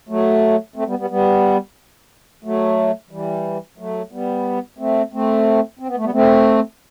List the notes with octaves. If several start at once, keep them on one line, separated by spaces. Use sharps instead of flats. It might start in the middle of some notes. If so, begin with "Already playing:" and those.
F#3 A3
A3 C4
G3 B3
G3 B3
G3 B3
F#3 A3
E3 G3
F#3 A3
G3 B3
A3 C4
A3 C4
C4
B3
A3
G3 B3
A3 C4